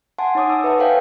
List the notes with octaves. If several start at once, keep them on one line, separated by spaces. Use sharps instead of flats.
F#5 G#5 A5 C6
D#4 C#5 D6 D#6
E6
B4 E5 F#5 A5
A4 C5 C#5 F5 G5 G#5